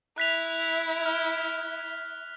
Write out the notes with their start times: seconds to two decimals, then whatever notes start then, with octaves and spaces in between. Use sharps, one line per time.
0.18 E4 F#6 B6 F7
1.06 F6